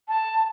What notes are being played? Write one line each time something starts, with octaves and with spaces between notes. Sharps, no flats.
A5